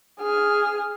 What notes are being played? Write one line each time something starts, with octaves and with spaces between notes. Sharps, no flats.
G#4 F6